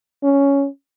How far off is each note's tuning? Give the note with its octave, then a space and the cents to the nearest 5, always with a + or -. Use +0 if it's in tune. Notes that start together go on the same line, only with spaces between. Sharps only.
C#4 +5